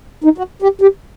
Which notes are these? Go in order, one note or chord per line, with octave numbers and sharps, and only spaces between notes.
D#4
F#4
G4
G4